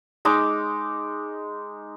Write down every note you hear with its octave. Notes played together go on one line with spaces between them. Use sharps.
G#3 D#4 D6